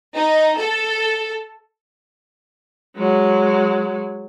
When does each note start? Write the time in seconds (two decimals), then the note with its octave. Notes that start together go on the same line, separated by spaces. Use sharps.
0.15 D#4
0.57 A4
2.96 F#3 G#3